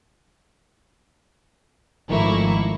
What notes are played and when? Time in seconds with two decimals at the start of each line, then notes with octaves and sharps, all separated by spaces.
2.09 G#1 D#3 F3 A3 A#3 E4 C#6